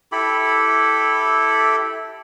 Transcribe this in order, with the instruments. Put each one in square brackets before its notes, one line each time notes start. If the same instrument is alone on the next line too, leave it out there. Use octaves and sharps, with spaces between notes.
[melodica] E4 G4 A4 B5